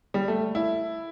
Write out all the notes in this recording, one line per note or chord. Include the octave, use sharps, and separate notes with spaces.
G3
A3
E4